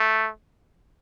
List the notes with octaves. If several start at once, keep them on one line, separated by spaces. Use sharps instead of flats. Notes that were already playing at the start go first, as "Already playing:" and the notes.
Already playing: A3